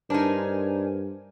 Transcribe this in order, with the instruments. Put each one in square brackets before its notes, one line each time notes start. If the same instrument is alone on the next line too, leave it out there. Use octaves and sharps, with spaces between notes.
[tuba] G2 [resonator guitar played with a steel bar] D4 D#4 [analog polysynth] A#4 C5 G#5